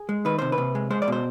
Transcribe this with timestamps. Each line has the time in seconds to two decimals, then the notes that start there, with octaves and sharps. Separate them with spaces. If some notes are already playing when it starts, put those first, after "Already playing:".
Already playing: G#4
0.09 G#3
0.25 D#3 B4
0.39 C3 C5
0.52 B4
0.58 C3
0.75 G#3
0.91 G#3 C5
1.02 D5
1.08 B2 C5